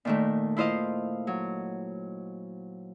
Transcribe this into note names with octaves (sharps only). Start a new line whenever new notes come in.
A#2 D#3 A3
E4 F4 C5 D#5 F5
F#3